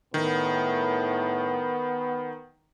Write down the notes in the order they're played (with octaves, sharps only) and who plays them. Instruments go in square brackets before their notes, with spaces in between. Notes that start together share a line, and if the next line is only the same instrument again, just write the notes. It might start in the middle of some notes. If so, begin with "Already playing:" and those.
[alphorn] A2 [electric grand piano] D#3 [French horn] B3